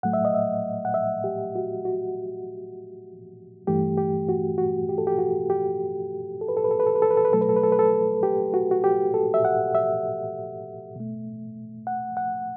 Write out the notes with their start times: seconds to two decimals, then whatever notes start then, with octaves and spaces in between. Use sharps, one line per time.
0.03 A2 F#3 A3 F#5
0.13 E5
0.25 D#5
0.34 E5
0.85 F#5
0.94 E5
1.24 G4
1.55 F#4
1.85 F#4
3.67 G2 E3 A3 G4
3.98 G4
4.29 F#4
4.58 F#4
4.89 G4
4.98 A4
5.07 G4
5.19 F#4
5.50 G4
6.41 A4
6.48 B4
6.57 A4
6.64 B4
6.71 A4
6.80 B4
6.86 A4
6.95 B4
7.02 A4
7.11 B4
7.17 A4
7.25 B4
7.32 B2 F#3 A3 A4
7.41 B4
7.49 A4
7.56 B4
7.63 A4
7.72 B4
7.79 A4
8.23 G4
8.54 F#4
8.71 F#4
8.84 G4
9.14 A4
9.34 E5
9.45 F#5
9.75 E5
10.96 B2 A3
11.87 F#5
12.17 F#5